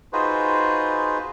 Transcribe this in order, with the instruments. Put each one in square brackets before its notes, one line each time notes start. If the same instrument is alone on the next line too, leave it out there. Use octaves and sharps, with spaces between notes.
[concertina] D#4 F4 F#4 G#4 B4 C5